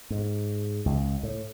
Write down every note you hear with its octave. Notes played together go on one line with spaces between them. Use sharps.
G#2
C#2
A2